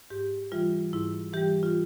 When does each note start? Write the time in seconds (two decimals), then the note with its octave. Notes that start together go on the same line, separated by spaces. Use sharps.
0.10 G#2 G4
0.52 E3 G3 F4
0.93 G#2 E4
1.33 E3 G3 G4
1.63 F4